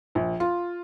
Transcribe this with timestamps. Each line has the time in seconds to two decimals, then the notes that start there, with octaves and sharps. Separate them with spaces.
0.15 A#1
0.40 F4